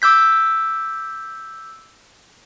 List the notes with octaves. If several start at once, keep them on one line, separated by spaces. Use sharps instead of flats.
D6 E6 G6 B6